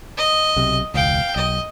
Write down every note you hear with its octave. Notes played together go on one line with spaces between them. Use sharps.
D#5
B1 C3
E1 C#2 F5 G5
B1 D#5